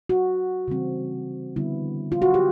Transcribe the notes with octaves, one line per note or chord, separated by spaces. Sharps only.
F#4
C#3 E3 G3 C4
D3 G3 B3 E4
F4
F#4
G4